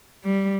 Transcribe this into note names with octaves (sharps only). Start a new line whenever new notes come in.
G3